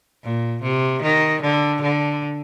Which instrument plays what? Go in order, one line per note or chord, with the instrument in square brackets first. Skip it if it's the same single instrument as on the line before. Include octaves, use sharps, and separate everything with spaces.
[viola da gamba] A#2
C3
D#3
D3
D3